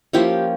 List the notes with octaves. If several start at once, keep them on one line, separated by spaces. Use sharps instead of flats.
F3 A#3 C#4 E4 G4